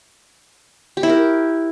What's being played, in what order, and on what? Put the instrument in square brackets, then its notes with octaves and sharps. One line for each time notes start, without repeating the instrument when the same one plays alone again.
[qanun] G4
E4
A#4